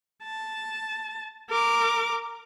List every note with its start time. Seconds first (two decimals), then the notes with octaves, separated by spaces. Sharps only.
0.23 A5
1.50 A#4 D6